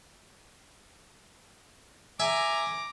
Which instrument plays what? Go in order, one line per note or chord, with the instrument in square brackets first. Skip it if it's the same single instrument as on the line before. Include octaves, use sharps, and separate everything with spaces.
[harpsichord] E5 [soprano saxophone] G#5 [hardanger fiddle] A#5 D6